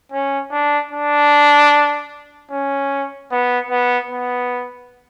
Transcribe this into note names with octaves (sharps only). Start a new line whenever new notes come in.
C#4
D4
D4
C#4
B3
B3
B3